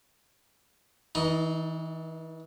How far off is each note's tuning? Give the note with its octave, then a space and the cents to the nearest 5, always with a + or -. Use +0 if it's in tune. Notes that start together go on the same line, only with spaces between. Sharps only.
E3 -35 D#4 +0